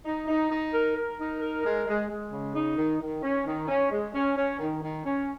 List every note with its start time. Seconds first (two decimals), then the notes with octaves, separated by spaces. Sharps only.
0.05 D#4
0.28 D#4
0.51 D#4
0.73 A#4
0.96 A#4
1.19 D#4
1.41 A#4
1.64 G#3
1.87 G#3
2.10 G#3
2.32 C#3
2.55 D#4
2.77 D#3
3.01 D#3
3.23 C#4
3.46 D#3
3.68 C#4
3.91 G#3
4.14 C#4
4.36 C#4
4.59 D#3
4.82 D#3
5.05 C#4